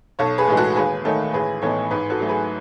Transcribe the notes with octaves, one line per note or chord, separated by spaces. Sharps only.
B1 A4 C#5
G#4 B4
A2 E3 G#3
F#4 A4
D#2 G#4 B4
D#3 A3 D#4 A4 C#5
A1 G#4 B4
A2 E3 B3 D#4 A4 C#5
G#2 G#4 B4
F#4 A4
F#3 A3
G#4 B4